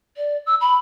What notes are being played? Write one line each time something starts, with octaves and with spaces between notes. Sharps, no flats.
D5
E6
B5